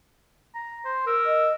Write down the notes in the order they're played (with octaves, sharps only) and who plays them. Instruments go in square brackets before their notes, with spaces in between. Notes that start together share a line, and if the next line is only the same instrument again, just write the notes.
[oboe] A#5
C5
[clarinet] A#4 [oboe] E6
[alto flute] D#5